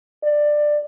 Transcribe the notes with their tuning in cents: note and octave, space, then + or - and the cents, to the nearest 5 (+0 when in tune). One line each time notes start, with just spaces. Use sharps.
D5 +15